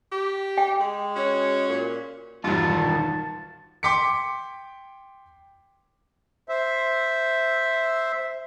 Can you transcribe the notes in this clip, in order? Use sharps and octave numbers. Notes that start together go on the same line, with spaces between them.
G4
G5
G#3
C#4 F#4 C#5
A#2
E1 G2 D#3 F4 A5
G5 C6 D6 B6 C#7
C5 E5